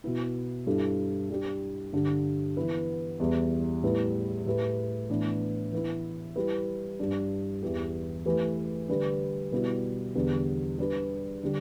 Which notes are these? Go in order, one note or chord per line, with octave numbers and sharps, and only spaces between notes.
B2 B3 E4
G2 G3 E4 A4
G3 D4 G4
G2 D3 G3
E3 B3 E4 B4
E2 E3 G3
A2 G3 B3 E4 B4
A2 A3 G4 B4
A2 E3 B3 D4 B4
E3 B3 E4
G3 E4 G4 B4
G2 G3 D4
E2 E3 B3 G4
E3 A3 G4 B4
D3 G3 D4 G4 B4
B2 G3 B3 E4 G4
E2 D3 G3 B3 D4
G3 D4 G4 B4
D3 G3 D4